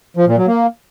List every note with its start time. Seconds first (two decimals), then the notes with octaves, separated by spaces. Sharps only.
0.17 F3
0.27 A#2
0.37 F#3
0.47 A#3